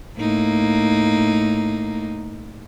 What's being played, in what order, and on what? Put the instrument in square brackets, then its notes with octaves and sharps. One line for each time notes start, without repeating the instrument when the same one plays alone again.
[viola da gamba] A2 A#3 D#4